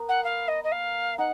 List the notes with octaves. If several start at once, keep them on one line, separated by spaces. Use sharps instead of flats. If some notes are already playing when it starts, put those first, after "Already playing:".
Already playing: B3 A#4
F#5
F5
D#5
D#5
F5
D#4 F#5